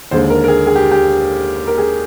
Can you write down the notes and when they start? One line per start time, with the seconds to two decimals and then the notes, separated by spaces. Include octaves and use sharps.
0.11 D#2 D3 G#3 C5
0.30 A#4
0.44 A#4
0.48 G#4
0.67 G#4
0.76 G4
0.91 G4
1.67 A#4
1.78 G#4